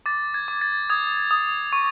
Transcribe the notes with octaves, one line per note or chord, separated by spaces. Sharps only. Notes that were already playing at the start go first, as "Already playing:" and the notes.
D6 A6
G#6
D6
A6
D#6 G#6
D#6
C#6